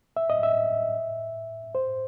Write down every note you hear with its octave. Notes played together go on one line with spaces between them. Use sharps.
E5
D#5
E5
C5